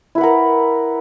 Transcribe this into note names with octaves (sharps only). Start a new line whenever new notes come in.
E4 A#4 B4 F#5